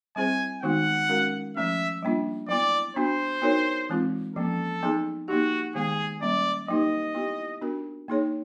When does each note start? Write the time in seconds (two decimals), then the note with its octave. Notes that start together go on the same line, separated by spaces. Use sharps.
0.16 G3 C4 E4 G#4 C5 G#5
0.63 D#3 G#3 B3 D#4 F#4 F#5
1.09 G#3 C#4 F#4 A#4
1.56 F3 A3 C#4 E5
2.02 G3 A#3 D4 F4
2.49 F#3 B3 E4 D5
2.95 B3 D4 F#4 C5
3.42 B3 D#4 F#4 A#4 C#5
3.89 E3 G#3 C4 F4
4.36 F3 A#3 C#4 A4
4.83 F#3 B3 D#4 G#4
5.28 A#3 D#4 F#4 G4
5.75 D#3 G#3 B3 G#4
6.21 G3 A#3 C#4 D5
6.68 F#3 A#3 D#4 G4 B4 D#5
7.14 B3 E4 G4
7.61 B3 D4 F#4 A#4
8.08 A#3 D#4 G#4 C#5